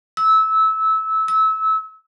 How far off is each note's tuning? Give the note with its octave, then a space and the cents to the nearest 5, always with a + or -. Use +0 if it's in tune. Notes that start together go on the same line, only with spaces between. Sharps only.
E6 -20
E6 -25